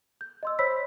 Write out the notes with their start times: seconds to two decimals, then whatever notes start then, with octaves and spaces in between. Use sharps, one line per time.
0.21 G6
0.43 D#5 C6 E6
0.59 C5 C#5 B5 E6 B6